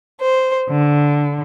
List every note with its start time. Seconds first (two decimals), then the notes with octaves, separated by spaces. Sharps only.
0.21 C5
0.70 D3